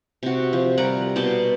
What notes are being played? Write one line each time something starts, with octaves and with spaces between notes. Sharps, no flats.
C3 F#4
F3
G3 A#4 F#5
B2 D5 G5 A5